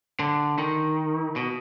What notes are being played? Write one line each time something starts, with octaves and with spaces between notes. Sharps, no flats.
D3
D#3
B2